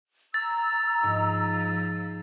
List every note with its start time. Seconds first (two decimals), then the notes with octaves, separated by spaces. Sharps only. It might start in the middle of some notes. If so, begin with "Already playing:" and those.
0.34 A#5 E6 A6
1.03 G#2 F3